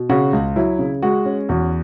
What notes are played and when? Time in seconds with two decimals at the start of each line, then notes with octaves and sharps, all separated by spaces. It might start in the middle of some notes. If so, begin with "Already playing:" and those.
Already playing: B2
0.10 C#3 F#4
0.33 C#2
0.56 F#3 E4
0.79 C#3
1.03 G#3 F#4
1.26 C#4
1.49 E2 F#4